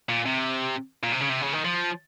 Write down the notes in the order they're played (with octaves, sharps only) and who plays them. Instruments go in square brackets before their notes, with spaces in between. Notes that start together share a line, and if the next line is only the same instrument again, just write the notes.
[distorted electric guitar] A#2
C3
A#2
C3
C#3
C3
C#3
D#3
F3